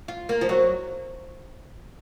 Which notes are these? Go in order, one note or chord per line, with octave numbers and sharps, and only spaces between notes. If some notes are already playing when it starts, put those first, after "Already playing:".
F4
A#3
F3
F#3